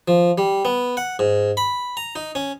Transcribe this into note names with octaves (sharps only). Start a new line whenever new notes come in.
F3
G3
B3
F#5
G#2
B5
A#5
D#4
C#4